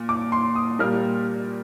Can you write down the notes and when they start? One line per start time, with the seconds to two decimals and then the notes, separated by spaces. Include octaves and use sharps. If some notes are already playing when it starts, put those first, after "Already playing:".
Already playing: A#2
0.09 D6
0.32 C6
0.55 D#6
0.79 A#2 G3 A#3 F6